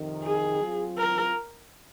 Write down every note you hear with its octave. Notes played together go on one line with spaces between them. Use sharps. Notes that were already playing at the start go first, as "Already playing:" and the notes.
Already playing: F2 C3 D#3
G#4
F#3 C4 F4
A#4